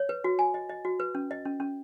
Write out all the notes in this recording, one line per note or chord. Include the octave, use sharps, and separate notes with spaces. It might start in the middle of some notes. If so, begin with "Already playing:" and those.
Already playing: C#5
B4
F#4
G#5
D#5
D#5
F#4
B4
C#4
D#5
C#4
C#4